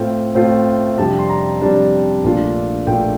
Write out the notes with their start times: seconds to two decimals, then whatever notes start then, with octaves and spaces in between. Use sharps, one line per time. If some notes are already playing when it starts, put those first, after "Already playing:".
Already playing: A2 A3 C4 F4 G5
0.35 A2 A3 C4 F4
0.98 F2 C3 G3 D4 A5
1.19 C6
1.29 A#5
1.61 F2 C3 G3 D4 A5
2.24 A#1 A#2 A3 D4 F4
2.87 A#1 A#2 A3 D4 F4 G5